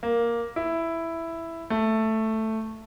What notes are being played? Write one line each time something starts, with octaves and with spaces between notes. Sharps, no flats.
A#3
E4
A3